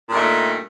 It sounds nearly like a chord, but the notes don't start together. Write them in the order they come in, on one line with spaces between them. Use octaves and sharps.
A#2 G2 D#3 A3